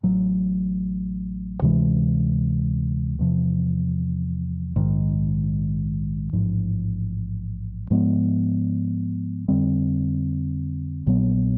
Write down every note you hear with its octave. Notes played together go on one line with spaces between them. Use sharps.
A1 A2 F#3
D2 C3 E3 G#3
E2 C3 F3
A#1 G#2 D#3
A1 G#2 F3
G#2 F3 G#3 B3
F2 D3 G3 C4
A#1 A#2 F#3 B3